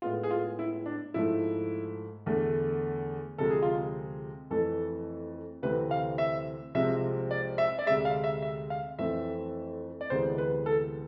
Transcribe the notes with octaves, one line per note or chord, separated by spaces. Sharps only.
A2 G#3 B3 F4
G#4
F4
E4
D4
G#2 F3 A3 E4
E2 D3 A3
D2 C3 F3 G#3 A4
G#4
F4
G#4
F2 E3 A3 A4
D2 C3 E3 A3 C4 B4
F5
E5
C2 C3 F3 G#3 C4 E5
D5
E5
D5
D2 C3 G#3 E5
F5
E5
E5
F5
F2 E3 A3 C4 E5
D5
D2 C3 E3 G#3 B3 C5
B4
A4